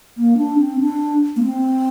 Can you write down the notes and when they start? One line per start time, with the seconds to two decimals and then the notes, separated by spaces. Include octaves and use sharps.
0.18 A#3
0.37 D4
0.59 C4
0.80 D4
1.36 A#3
1.43 C4